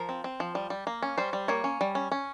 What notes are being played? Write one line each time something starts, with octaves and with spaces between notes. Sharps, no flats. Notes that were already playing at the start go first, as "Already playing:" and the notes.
Already playing: F3 A#4
C4
C4
F3
G3
G3
A#3
C#4
G3 C5
G3
A#3 C#5
C#4
G3
C#4
C#4